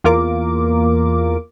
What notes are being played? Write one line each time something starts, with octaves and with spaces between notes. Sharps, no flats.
E2 A#3 F4 A#4 D6